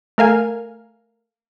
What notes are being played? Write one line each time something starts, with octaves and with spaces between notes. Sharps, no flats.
A3 A#4 F5 G#5